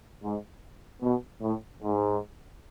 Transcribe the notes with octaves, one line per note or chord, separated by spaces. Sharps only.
G#2
B2
A2
G#2